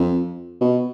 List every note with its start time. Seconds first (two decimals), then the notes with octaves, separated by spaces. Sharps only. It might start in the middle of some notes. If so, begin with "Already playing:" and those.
Already playing: F2
0.61 B2